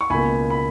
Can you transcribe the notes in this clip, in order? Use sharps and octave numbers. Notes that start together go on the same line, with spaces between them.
C#6
C#2 B2 A#3 G#5 B5
B5